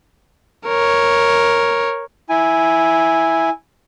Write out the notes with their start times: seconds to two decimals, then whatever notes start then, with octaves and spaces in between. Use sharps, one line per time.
0.68 A#4 C#5
2.29 E4 G#5